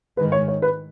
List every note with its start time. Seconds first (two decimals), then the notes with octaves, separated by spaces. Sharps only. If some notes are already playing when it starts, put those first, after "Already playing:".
0.17 G#2 D#3 G#3 B4
0.32 C#5
0.48 C#5
0.62 B4